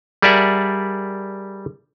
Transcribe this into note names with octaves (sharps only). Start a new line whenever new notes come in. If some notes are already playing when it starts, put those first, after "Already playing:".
G3 G#4 A#4 D5 E5 F#5